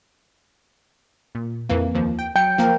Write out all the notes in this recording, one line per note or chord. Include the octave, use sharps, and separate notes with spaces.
A#2
F2 E3 A#3
D#2 F3
G5
F#3 G5 C#7
F3 A#3 A#4